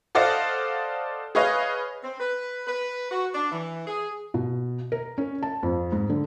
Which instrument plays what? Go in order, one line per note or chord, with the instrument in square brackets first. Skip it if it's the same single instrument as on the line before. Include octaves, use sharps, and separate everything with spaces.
[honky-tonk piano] A4 C5 D5 D#5 F5 F#5
G#4 B4 C#5 D#5 F5
[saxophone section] C4
B4
B4
F#4
D4
E3
G#4
[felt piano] B2
A#4
C#4
A5
F2
G#2
D3